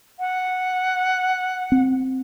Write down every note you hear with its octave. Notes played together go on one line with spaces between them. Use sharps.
F#5
C4